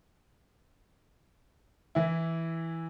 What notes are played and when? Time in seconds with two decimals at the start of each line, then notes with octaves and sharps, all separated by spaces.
1.95 E3 E4